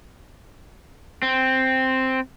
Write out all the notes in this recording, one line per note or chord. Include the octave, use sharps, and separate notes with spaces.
C4